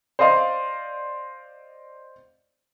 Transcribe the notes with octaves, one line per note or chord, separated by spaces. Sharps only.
C5 D5 D#5 F5 C6